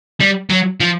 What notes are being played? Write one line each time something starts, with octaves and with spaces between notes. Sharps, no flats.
G3
F#3
F3